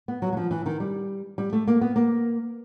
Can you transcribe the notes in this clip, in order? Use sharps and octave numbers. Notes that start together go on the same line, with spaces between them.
B3
F#3
F#3
F3
E3
D#3
G3
G3
A3
A#3
B3
A#3